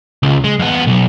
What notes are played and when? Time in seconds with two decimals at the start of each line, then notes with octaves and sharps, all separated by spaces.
0.23 C#2
0.44 G#3
0.59 F2 B3
0.87 B1